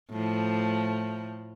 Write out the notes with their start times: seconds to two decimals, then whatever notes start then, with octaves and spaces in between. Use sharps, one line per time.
0.11 A2 F3